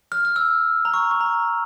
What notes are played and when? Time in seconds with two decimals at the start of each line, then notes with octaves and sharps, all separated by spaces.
0.12 F6
0.25 F6
0.36 E6
0.85 A#5
0.94 C#6
1.11 C#6
1.21 A#5